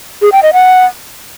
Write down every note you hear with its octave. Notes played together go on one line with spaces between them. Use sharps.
G#4
G5
D#5
F#5